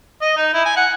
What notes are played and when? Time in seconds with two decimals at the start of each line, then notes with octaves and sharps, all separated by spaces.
0.22 D#5
0.37 D#4
0.54 E4
0.66 G#5
0.77 F#5